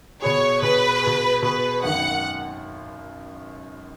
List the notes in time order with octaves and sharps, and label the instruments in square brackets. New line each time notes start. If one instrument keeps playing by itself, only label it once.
[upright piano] B2 B3 G#4 [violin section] C#5
[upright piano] B2 B3 G#4 [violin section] B4
[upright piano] B2 B3 G#4
[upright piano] B2 B3 G#4 [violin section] B4
[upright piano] G#1 F#2 D#3 [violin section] F#5